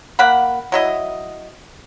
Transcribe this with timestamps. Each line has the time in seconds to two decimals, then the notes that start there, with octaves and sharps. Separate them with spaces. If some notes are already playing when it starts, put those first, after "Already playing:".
0.19 A#3 F#5 B5
0.72 F#3 E4 D#5